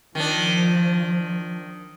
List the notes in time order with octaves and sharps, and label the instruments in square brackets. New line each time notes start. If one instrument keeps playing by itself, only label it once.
[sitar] D#3 D4 [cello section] F3